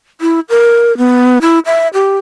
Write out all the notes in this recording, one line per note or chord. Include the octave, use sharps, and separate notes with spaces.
E4
A#4
B3
E4
E5
G4